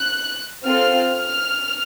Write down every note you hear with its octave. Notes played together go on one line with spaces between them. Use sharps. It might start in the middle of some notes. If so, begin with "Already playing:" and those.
Already playing: F#6
C4 F4 A4 F6
F6